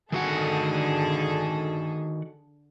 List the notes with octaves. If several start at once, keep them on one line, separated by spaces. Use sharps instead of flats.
D3 D#3 F#4 G#4 A4 F#5